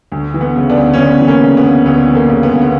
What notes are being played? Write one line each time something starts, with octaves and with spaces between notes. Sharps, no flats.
D2
E3
B3
C#3
B3 D4
D2
C#4
D2 B3 D4
E3
A#3 C#4
C#3
B3
D2
D2 B3
E3
A#3
C#3
B3
D2
B3